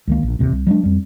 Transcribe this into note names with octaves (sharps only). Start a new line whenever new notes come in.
C#2 D#3 A#3
A#1
A1 D#2 C3
C2
F#3 G#3 C#4 D4
F2 G3